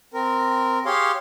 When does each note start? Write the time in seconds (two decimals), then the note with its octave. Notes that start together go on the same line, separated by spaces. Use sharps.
0.14 C4 A#4
0.86 G4 G#4 C#5 F5 C6